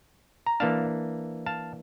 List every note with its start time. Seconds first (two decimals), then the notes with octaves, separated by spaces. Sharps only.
0.47 A#5
0.60 E3 A#3 D4 F5 A5
1.46 F5 A5